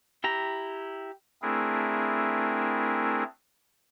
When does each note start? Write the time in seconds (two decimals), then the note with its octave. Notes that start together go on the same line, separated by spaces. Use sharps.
0.24 E4 G4 A#5
1.42 A3 C4 D4 E4 G#4 A#4